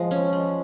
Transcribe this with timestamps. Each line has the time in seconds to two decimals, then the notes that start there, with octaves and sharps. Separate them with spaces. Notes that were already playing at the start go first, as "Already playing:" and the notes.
Already playing: F3 G#3
0.11 C#4
0.33 G#3